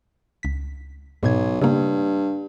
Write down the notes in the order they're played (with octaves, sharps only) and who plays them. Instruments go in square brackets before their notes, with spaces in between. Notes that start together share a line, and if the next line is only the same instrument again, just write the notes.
[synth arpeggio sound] C#2 B6
[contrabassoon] B1 [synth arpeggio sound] G#2 B2 G#6
[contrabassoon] G2 [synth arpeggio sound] C#3 A#3